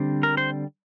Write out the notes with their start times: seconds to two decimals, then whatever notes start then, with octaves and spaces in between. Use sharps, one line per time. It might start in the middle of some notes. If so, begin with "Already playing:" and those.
Already playing: D3 G3 C4
0.23 A#4
0.37 C5